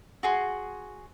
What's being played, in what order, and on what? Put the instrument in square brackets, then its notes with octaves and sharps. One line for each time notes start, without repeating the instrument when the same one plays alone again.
[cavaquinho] F#4 G#4 C6